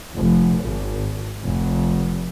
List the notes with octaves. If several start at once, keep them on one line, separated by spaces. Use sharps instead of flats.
F1
G#1
F1